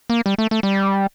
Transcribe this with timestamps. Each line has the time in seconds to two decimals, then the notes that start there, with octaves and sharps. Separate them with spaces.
0.10 A#3
0.26 G3
0.38 A3
0.51 A3
0.63 G3